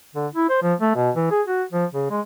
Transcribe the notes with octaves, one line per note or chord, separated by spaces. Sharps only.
D3
E4
C5
F3
A3
B2
E3
G#4
F#4
F3
C#3
G#3